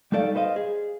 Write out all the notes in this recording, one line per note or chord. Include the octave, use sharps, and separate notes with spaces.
G3 A3 D#4 A4 D5 F5
B4 C5 D#5 F5
G#4